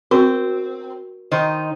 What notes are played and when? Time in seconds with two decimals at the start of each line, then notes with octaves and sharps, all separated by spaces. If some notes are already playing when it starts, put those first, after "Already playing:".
0.11 C4 F#4 A#4 C#6
1.31 D#3 D#4 C5